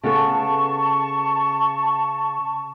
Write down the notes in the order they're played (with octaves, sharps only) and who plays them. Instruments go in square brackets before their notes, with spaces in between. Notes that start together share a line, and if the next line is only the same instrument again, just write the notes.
[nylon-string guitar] C#3 B3 A4 [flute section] A5 C#6